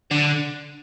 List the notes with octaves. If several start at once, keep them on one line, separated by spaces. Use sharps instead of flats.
D3